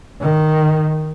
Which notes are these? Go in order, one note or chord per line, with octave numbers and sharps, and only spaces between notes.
D#3